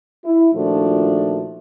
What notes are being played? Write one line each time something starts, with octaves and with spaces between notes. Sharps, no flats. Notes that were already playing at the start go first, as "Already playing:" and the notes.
E4
A#2 D#3 F3 A3 D4 F#4